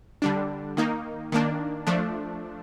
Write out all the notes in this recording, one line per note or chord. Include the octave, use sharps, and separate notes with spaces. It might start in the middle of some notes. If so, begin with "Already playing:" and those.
D3 G3 D4
D#3 A#3 D#4
D#3 A#3 D4
F3 A3 D4